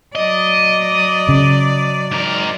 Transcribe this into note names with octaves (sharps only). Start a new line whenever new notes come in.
F#3 D5 D#5
C#3
G#2 A#4